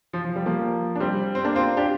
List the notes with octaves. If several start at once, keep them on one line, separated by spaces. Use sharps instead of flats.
F3
F3
G3
F3 A#3
D4
G3 C4
C4
A#3 D4
C4 F4
D4 G4